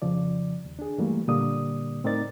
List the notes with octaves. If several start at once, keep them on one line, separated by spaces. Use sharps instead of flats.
F2 C#3 F3 D5
D#2
D4 G#4
G2 E3 F#3 G3 A3 A#3
A#2 D3 G3 A#3 D5 D#6
A2 C4 D#4 A#4 D5 A6